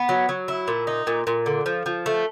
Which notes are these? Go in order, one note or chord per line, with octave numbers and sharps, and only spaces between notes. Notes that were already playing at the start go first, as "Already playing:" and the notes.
Already playing: B3
F#3
F#3
E4
A#2
D#4
A#2
A#2
D3
F3
F3
A3